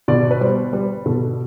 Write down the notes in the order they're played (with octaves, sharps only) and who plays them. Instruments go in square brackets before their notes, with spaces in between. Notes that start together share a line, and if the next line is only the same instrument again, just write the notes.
[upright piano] B2 D5
B4
G3 C5
G3 B4
B2 A4